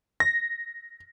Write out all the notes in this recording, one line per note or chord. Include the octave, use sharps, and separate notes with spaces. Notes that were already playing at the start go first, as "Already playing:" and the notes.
A#6